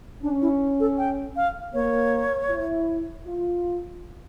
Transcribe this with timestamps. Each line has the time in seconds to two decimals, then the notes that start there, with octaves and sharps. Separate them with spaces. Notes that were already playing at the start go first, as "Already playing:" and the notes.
0.22 C#4 D4
0.42 E4
0.80 A4
0.98 G5
1.36 F5
1.74 A#3 C#5
2.50 E4
3.26 F4